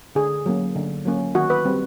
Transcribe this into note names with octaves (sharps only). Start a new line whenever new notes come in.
D3 G#4
F#3 A#3 C#4
D3
F#3 A#3 C#4
D#3 F#4
B4
G3 C4